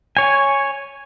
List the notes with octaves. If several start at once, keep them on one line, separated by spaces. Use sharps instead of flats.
C#5 G#5